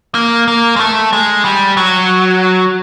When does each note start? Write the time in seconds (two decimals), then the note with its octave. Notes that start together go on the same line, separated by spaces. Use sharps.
0.15 A#3
0.48 A#3
0.76 G#3
0.80 A3
1.13 G#3
1.45 G3
1.77 F#3